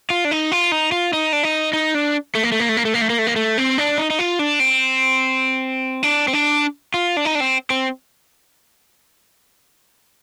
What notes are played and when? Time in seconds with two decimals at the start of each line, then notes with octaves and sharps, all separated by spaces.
0.10 F4
0.25 D4
0.31 D#4
0.52 F4
0.72 D#4
0.92 F4
1.13 D#4
1.33 D4
1.43 D#4
1.73 D#4
1.95 D4
2.35 A3
2.43 A#3
2.52 A3
2.60 A#3
2.69 A3
2.77 A#3
2.85 A3
2.94 A#3
3.01 A3
3.10 A#3
3.19 A3
3.27 A#3
3.36 A3
3.58 C4
3.78 D4
3.98 D#4
4.10 D#4
4.19 F4
4.39 D4
4.60 C4
6.03 D4
6.28 C4
6.33 D4
6.94 F4
7.17 D4
7.25 D#4
7.35 D4
7.40 C4
7.70 C4